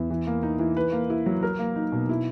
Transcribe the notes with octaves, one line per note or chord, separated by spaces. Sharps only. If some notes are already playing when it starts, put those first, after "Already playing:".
Already playing: E2
E3
A#3
D#4
E3
B4
A#3
E4
F#3
A#4
A#3
D#4
B2
E4